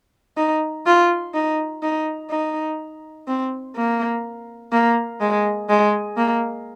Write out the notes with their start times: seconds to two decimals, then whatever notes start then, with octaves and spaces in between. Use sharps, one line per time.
0.37 D#4
0.86 F4
1.34 D#4
1.82 D#4
2.30 D#4
3.28 C4
3.75 A#3
4.72 A#3
5.20 G#3
5.69 G#3
6.17 A#3